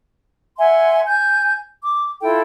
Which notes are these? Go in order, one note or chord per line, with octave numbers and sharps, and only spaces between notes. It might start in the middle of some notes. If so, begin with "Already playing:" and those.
E5 F#5 G#5 C6
G#5 G6
D6
E4 F4 A4 G5